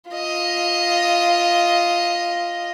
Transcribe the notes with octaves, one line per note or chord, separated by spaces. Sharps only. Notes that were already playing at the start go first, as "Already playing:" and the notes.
F4 D#5